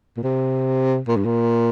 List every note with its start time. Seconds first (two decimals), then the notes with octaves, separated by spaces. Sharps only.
0.17 A#2
0.23 C3
1.08 A#2
1.17 G2
1.25 A#2